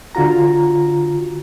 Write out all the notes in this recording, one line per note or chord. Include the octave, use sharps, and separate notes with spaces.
D3 F4 F#4 A#5